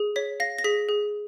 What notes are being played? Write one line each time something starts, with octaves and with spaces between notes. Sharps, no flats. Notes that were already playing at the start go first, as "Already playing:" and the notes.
Already playing: G#4
C#5 B6
F5 A#6
A#6
G#4 B6
G#4